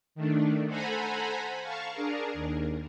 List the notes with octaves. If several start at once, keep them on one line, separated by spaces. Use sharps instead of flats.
D#3 A3 D4
A4 C5 F#5 G#5 A#5 B5
F5 A5 C#6
D4 G#4 A#4
D#2